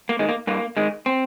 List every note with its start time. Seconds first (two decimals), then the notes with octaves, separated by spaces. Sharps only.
0.09 A#3
0.19 D#3 G#3
0.29 A#3
0.47 G2 A#3
0.77 D#3 G#3
1.06 C4